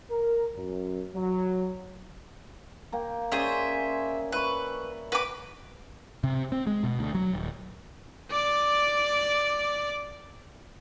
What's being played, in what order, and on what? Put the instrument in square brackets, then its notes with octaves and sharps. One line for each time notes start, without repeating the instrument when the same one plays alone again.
[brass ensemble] A#4
F#2
F#3
[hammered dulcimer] A#3 G5
[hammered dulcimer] C#4 D5 [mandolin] G#4 C5 E5
[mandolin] B4 [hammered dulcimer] E5 C#6
[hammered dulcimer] F#4 [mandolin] B4 D6
[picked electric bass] C3
C4
G#3
B2
D2
F#3
D#1
[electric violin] D5 D6